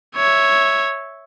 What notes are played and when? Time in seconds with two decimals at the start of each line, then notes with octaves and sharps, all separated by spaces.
0.16 C#5 E5